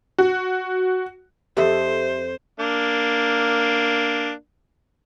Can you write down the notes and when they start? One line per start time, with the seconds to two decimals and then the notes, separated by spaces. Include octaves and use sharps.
0.18 F#4
1.57 F2 G4 A4 C5 D#5 E5
2.60 A#3 D4